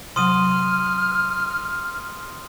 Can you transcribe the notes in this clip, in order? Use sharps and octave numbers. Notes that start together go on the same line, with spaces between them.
C3 F#3 C6 D#6 F6 D#7